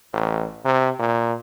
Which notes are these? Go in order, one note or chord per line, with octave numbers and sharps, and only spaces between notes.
A1
C3
A#2